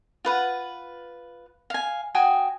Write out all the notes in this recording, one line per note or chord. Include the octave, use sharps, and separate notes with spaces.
F4 B4 F#5
F5 G#5
F#4 G5 G#5 D#6